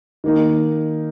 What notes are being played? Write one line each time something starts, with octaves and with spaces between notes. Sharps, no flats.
D#3 A#3 D#4